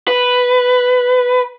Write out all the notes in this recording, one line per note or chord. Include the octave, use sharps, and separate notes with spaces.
B4